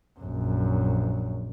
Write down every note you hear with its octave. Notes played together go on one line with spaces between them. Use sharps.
A#1 F#2